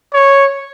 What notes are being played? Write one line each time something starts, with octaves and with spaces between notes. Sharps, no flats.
C#5